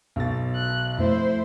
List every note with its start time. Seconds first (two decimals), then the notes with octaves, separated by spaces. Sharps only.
0.16 B1 B2 A6
0.56 F#6
0.98 F2 A3 E4 C5